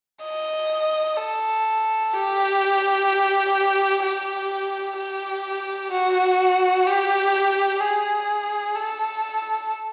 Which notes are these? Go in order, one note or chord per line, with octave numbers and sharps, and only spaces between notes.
D#5
A4
G4
G4
G4
F#4
G4
G#4
A4